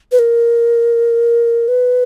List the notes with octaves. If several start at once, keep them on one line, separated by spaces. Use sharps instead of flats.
B4
A#4
B4